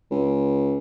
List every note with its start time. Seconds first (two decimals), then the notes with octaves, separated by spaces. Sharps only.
0.11 C#2